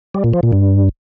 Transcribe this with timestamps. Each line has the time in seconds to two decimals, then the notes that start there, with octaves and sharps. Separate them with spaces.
0.15 G3
0.24 A#2
0.33 F3
0.43 A#2
0.52 G2